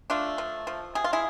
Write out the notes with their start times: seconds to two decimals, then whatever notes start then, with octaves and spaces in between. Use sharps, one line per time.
0.10 A3 D4 F4
0.38 F3
0.67 F3
0.95 C3 G#4
1.04 F4
1.13 E4 G#4